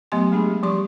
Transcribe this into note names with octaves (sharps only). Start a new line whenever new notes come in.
F#3 A3 B3 G4 G#5 C6
G#3 A3 D4 G4 G#4
F3 G3 G4 C6 C#6